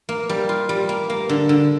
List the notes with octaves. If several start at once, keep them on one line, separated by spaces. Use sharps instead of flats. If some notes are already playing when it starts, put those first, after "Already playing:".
A#3
G3
F4
G3
A#3
A#3
D3
D3